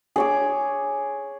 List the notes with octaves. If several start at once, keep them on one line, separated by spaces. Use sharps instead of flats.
G#4 C#5 D6